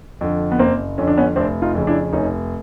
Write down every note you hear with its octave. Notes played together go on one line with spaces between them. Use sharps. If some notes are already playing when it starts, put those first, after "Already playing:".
F2 D3
B3
F#1 A#3 C4
F2 D3 C#4
D4
B3 C#4
F1 C4 D4
D#4 F4
F2 C#3
D4 E4
F1 C#4 D#4